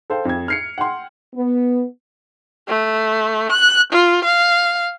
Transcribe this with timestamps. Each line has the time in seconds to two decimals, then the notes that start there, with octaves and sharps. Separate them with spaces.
0.10 A4 C5 F5 G5
0.25 F2 G#6
0.48 F6 C7 C#7
0.78 F#5 G5 C6
1.34 B3
2.68 A3
3.52 F#6
3.93 F4
4.24 F5